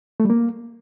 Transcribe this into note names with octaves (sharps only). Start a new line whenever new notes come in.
A3
G3
A#3